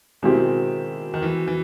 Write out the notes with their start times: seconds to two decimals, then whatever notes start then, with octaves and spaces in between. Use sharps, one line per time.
0.22 B2 D#3 G#3 C4 E4 G4
1.14 D#3
1.22 E3
1.48 E3